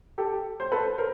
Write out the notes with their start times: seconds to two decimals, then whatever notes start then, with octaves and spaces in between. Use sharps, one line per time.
0.18 G4 A4
0.60 C5
0.72 A4 B4
0.98 A#4 C5